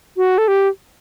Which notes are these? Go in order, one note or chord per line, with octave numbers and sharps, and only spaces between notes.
F#4
A4
G4